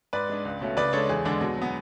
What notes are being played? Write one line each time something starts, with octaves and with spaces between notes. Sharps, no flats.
G#2 B4 D5
G#3 D4
C#2
B2 A3 C#4
C#3 B4 D5
G#3 D4 A4 C#5
E2 G#4
D3 G#3 D4
B2
F#3 B3